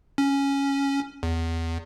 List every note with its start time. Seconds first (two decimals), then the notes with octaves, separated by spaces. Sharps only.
0.18 C#4
1.23 E2